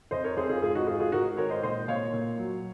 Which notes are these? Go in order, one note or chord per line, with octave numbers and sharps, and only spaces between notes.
F2 C5 D#5
A#4 C#5
F2 G#4 C5
F4 G#4
G#2 F4 G#4
D#4 F#4
G#2 F4 G#4
F4 G#4
G#2 F#4 A#4
D#3 A#4 C#5
C5 D#5
A#2 C5 D#5
A#2 C#5 F5
A#2
F#3